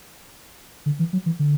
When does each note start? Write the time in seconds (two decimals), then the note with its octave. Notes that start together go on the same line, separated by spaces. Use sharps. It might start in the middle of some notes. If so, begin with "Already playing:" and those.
0.86 D3
0.99 E3
1.13 F#3
1.26 E3
1.39 D3